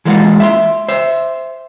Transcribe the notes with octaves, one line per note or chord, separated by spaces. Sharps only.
E3 G#3 A#3 D4 F4 F#4
E5 B5 C6
C5 E5